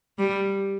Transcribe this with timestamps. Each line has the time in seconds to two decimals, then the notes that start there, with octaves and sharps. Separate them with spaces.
0.19 G3